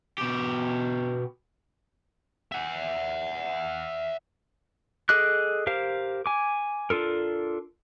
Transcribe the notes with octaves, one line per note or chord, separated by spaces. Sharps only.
B2 G4
E5 F#5
G#4 A4 D#5 D6 F#6
G4 A#4 C5 F5
G#5 D6
D4 F4 A4 A#4